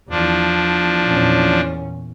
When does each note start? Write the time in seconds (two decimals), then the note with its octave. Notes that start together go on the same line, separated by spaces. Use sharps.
0.10 E2 F3 D4
1.08 E2 A#2 C#4